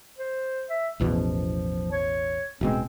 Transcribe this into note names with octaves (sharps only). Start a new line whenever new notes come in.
C5
E5
A1 E2 B2 F3
C#5
D1 B2 G#3 C4